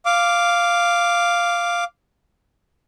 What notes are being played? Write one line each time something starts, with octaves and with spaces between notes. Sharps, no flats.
F5 D6